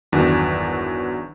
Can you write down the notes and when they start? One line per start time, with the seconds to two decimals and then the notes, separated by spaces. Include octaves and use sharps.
0.12 G1 E2 D#3 F#3 D4